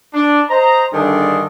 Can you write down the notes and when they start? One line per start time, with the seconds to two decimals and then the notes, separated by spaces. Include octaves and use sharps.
0.14 D4
0.49 C5 D#5 A#5
0.93 G2 D3 D#3 D4 G#4 A4